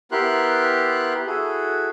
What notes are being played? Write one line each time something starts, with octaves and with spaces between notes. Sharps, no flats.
B3 E4 G4 A#4 C6 F#6
E4 F#4 G#4 A4